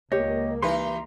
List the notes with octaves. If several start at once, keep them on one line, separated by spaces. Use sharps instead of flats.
C#2 A#3 G4 C#5 D#5
E3 D#4 G4 B4 A#5 C6